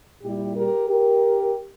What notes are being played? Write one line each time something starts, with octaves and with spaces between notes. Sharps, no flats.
A#2 G3 E4 G4
G4 A#4
G4 A#4